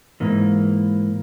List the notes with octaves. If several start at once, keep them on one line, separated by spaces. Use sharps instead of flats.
G#2 E3 A#3